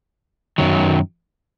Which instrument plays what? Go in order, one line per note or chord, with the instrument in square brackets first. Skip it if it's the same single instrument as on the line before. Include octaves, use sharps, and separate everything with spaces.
[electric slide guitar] F#2 D#3 F#3